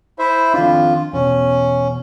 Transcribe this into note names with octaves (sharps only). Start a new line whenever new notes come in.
E4 C5 E5
F2 D#3 D4 F4
E2 B2 C#4